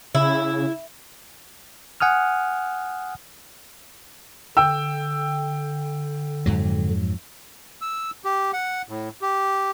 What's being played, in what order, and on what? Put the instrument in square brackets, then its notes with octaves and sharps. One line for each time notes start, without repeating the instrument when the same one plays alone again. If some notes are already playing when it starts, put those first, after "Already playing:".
[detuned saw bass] C#3 [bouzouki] E4
[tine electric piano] F#5 G#5 D#6 F6
[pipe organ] D3 [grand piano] G5 E6
[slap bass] F2 G#2 F#3
[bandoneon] E6
G4
F#5
A2
G4